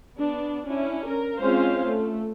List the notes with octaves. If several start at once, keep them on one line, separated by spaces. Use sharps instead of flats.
B3 D4
C#4 D4 E4
A#4
G#3 C4 C#4 F4 C5 F5
A3